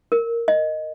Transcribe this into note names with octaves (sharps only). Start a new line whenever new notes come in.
A#4
D#5